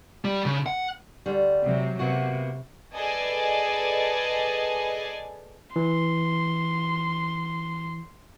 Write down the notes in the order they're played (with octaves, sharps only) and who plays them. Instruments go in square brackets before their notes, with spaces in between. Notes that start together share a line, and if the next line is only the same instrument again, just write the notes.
[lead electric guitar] G3
C#3
F#5
[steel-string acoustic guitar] D2 G3
[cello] C3 F#3
[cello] C3 [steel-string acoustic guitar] A#3 B3 F#4
[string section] G#4 A4 B4 D5 D#5 G#5
[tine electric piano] E3 [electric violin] C6